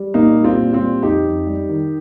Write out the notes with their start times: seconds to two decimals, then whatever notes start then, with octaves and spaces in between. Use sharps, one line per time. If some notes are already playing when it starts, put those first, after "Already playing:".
Already playing: G3
0.14 A#2 A#3 D#4
0.37 G3
0.44 C4 F4
0.58 A#2
0.73 C4 F4
0.80 G3
1.02 F2 D#4 G4
1.25 F2
1.47 G3
1.69 D#3